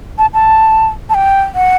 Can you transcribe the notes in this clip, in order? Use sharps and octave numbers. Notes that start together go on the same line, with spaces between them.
A5
A5
A5
G5
F#5